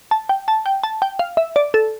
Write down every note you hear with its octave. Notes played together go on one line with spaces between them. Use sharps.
A5
G5
A5
G5
A5
G5
F5
E5
D5
A4